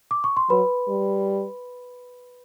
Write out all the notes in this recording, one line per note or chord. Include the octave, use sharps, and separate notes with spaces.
D6
C#6
C6
F#3 B4 B5
G3